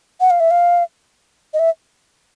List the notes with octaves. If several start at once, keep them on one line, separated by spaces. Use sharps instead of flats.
F#5
F5
E5
F5
D#5
E5